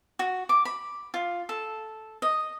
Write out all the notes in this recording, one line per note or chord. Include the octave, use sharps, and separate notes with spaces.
F#4
D6
B5
F4
A4
D#5